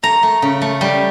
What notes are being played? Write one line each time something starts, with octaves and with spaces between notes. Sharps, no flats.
A3 A#5
A3
C#3
A3
G3